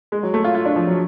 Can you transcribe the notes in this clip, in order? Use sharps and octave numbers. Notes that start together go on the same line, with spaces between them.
G#3
F#3
A3
F4
F4
D4
F3
F#3